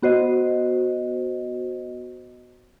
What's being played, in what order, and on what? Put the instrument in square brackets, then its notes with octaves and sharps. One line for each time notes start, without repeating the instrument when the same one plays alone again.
[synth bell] B3 F#4 C5 D#5